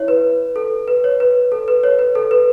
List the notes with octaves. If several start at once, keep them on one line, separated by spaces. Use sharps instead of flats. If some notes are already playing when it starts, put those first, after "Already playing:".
Already playing: E4 C#5 E5
B4
A4
B4
C#5
B4
A4
B4
C#5
B4
A4
B4